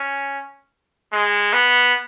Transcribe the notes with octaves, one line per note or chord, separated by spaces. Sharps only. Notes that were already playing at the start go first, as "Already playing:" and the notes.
Already playing: C#4
G#3
B3